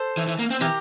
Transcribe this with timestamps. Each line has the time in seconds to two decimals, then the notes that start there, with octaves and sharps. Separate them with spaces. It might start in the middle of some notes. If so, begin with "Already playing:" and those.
Already playing: A4 C5
0.17 E3
0.28 E3
0.39 A#3
0.50 C4
0.61 E3 G4 A#4